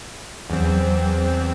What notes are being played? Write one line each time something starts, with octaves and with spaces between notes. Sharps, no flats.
E2 F#3 C4